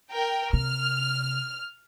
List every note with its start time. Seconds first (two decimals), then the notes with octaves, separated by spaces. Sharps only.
0.11 A#4 G5
0.53 C3 F6